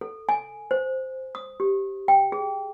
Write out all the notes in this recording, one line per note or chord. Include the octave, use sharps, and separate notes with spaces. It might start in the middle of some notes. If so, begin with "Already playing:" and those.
A4
G#5
C5
D#6
G4
G5
G#4